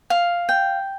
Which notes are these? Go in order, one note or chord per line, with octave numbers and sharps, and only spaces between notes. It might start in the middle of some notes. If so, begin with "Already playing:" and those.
F5
G5